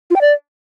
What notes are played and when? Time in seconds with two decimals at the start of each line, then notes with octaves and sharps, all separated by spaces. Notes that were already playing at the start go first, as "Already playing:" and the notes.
0.11 F4
0.16 G5
0.21 D5